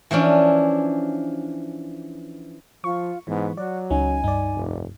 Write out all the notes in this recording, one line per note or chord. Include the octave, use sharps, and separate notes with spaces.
E3 F3 C#4 D4
F3 F4 C#6
G#2 E3 B3
F#3 F#4 D5
C#2 C#4 D#4 G#5
G2 D#4 D5
F1